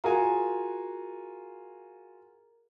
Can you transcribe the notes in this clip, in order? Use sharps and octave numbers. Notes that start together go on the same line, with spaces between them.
F4 F#4 G#4 A#4 G#5 A#5